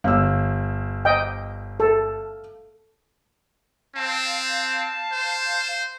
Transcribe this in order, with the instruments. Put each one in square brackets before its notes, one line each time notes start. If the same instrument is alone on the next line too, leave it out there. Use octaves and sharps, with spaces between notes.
[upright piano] G1 [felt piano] F5 E6
[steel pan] D#5 G5
A4
[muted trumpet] C4 [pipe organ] F5 A5
[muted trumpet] C5